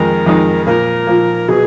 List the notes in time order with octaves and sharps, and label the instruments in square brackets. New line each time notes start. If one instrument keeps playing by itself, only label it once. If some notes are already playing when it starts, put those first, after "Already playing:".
Already playing: [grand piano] F2 D#3 G#3 D#4 [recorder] A#4
[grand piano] F2 D#3 G#3 D#4
[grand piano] A#2 F3 A#3 [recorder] A#4
[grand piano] A#2 F3 A#3
[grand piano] B2 F#3 B3 [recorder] G#4